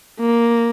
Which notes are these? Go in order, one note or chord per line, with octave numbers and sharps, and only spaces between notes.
A#3